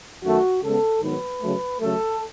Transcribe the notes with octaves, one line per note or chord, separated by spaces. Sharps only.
F#2 D#3 A3 F#4
C#3 G#3 B3 A4
G#2 D#3 F#3 B3 B4
C#3 F#3 A3
C#3 F#3 A3 A4